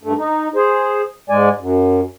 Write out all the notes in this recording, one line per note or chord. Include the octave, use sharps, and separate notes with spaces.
G2 A3
D#4
G#4 C5
G#2 G#3 D5 G#5
F#2